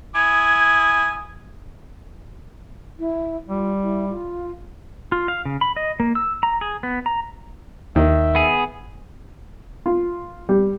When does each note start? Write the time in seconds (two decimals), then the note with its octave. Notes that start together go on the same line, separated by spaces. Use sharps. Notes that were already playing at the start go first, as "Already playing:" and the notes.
0.15 E4 G#5 D#6 G#6
2.99 E4
3.49 G3 F4
3.82 E4
4.10 F4
5.12 F4
5.28 F5
5.45 C#3
5.61 B5
5.76 D#5
6.00 A#3
6.15 E6
6.43 A#5
6.61 G#4
6.83 B3
7.06 A#5
7.96 D#2 D#3 E5
8.35 B3 G#4
9.86 F4
10.49 G3